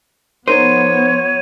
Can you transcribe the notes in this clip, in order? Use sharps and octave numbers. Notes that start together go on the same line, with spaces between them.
F3 B3 D#4 A#4 C5 C#5 D#7